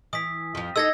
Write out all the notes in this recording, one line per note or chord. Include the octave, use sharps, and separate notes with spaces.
E3 D#6 B6
F2 F3
D#4 A4 D#5 E6 G#6 A#6